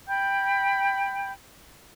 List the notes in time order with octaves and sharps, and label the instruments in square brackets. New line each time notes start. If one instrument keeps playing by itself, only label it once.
[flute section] G5 B5 G6